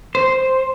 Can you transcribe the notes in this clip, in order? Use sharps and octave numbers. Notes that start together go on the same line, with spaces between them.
C5